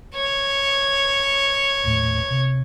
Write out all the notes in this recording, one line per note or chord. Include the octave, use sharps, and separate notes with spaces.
C#5
D#1 A2
C3